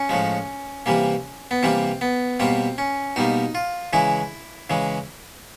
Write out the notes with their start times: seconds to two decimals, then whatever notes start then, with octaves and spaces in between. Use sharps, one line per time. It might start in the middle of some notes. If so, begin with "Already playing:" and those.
Already playing: C#4
0.09 A2 F3 G#3
0.86 C3 E3 G3 A#3
1.51 B3
1.63 C3 E3 G3 A#3 C4
2.01 B3
2.40 B2 G3 A#3 C4
2.78 C#4
3.16 B2 G3 A#3 D#4
3.55 F4
3.93 C#3 E3 G#3 E4
4.70 C#3 E3 G#3